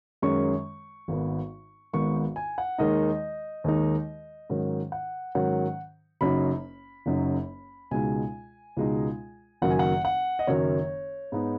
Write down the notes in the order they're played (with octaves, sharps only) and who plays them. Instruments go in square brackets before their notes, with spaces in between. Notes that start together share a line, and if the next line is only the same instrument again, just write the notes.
[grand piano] F#2 D#3 G#3 C#4 C#6
G#1 G#2 D#3 B3
G#1 G#2 D#3 B3 C#6
G#5
F#5
D#2 D#3 G#3 D#4 D#5
D#2 D#3 G#3 D#4
G#2 D#3 F#3 C#4
F#5
G#2 D#3 F#3 C#4 F#5
F#1 F#2 F#3 D#4 B5
F#1 F#2 F#3 D#4
C#2 B2 G#3 D#4 G#5
C#2 B2 G#3 D#4
F#1 F#2 D#3 F#3 F#5
G#5
F#5
F#5
D#5
F#1 F#2 D#3 F#3 C#5
G#2 G#3 B3 D#4